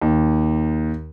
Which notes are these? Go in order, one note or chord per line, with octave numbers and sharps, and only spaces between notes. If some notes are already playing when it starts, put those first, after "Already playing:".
D#2